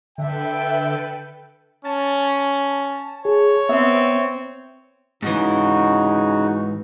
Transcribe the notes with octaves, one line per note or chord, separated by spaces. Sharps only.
D3 A4 B4 E5 G5
C#4 A5
G#4 C#5
B3 C4 E5
G#2 C#3 E3 D#4 F#4